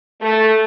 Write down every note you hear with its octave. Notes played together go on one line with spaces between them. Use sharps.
A3